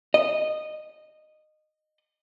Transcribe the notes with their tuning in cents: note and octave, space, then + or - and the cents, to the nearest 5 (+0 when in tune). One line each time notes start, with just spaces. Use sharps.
D#5 -15